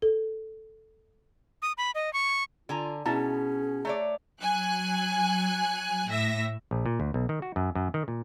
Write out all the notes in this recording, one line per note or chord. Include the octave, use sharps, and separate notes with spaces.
A4
D#6
B5
D#5
C#6
D3 F4 G#5 A#5
B2 C#4 E4 G#4 A5 A#5
A3 C#5 D5 A#5
F#3 G#5 F#6
A2 E5 A#6
A#1
A#2
D2
B1
D#3
F#4
F#2
F#2
D#3
A#2